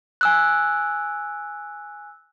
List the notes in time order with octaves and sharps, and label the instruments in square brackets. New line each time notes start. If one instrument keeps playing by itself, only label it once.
[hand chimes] G#5 E6 F#6